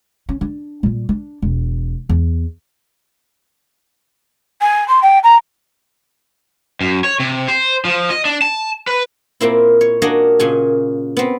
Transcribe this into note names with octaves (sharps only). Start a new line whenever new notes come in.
C#4
D4
A#2 G3
D4
E1
E2
G#5
C6
G5
A#5
F#2
C#5
C3
C5
F3
D#5
D4
A5
B4
A#2 A#3 C4 E4
C#5
A#3 D4 F#4 C#5 D#5 G#5
A#2 C#3 G#5
B3 C4